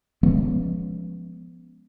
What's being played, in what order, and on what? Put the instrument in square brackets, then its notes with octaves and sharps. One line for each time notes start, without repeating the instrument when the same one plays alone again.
[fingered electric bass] F3 G#3 B3 C#4